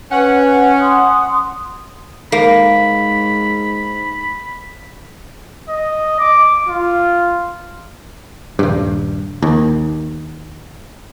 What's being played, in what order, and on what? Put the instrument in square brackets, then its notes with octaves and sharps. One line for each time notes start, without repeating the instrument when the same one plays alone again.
[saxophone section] C#4 [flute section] B4 [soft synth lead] F#5
[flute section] C6 D#6
[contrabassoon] G#2 [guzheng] A#3 [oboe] B5
[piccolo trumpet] D#5
D6
F4
[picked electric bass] D#1 G2
D#2